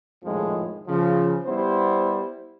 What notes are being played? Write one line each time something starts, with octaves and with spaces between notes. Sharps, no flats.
A#1 F2 A2 D#3 F3 G#3
C#3 F3
G3 B3 E4 C5